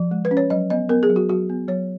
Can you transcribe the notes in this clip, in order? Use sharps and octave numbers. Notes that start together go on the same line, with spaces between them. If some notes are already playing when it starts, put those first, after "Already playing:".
Already playing: F3
G#3
B4
C#4
C#5
F#3 D#5
B3 D#5
B3 A#4
G#4
F#3
F#4
F#3 F#4
B3
F#3 C#5